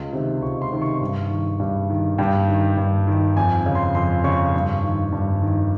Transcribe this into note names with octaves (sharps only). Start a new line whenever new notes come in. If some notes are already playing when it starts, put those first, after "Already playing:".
Already playing: C#2
C3 D#3
C#2 C#6
C6
C3 D#3
C#6
G2
D#3
G2
D#3
G2 G5
D#3
G2
D#3
F2 G#5
C#3
C6
F2 C6
C#3 C#6
G2
D#3
G2
D#3